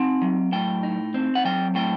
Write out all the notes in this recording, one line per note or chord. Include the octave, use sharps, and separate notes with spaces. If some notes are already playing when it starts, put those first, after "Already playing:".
Already playing: C4 D#4 F#5
F#3
A2 G5
D#4
C4
F#5
F#3 G5
A2 G5